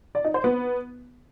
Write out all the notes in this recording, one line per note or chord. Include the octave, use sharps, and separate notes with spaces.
D5
D#4
C5
B3